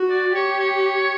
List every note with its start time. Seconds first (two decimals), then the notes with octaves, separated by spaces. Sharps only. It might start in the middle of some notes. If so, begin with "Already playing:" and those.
Already playing: F#4
0.10 D5
0.34 G4 C#5
0.59 C#5